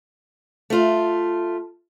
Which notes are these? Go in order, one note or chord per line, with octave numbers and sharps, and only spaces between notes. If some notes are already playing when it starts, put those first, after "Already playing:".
A3 F4